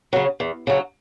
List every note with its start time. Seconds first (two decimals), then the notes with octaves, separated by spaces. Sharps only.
0.13 C#3 F#3
0.40 E2
0.67 C#3 F#3